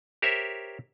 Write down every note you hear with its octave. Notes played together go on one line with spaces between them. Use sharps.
G4 A#4 C5 C#5 E5